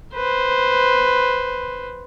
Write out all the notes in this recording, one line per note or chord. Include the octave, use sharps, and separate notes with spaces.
B4 C5